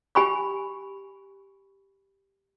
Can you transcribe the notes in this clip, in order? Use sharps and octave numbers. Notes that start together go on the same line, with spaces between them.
G4 G#5 B5 C#6